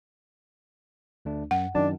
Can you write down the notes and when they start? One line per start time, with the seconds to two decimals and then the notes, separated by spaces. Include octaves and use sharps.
1.25 D2 A3 D4
1.51 F#2 F#5
1.75 F#2 D#3 D4 A5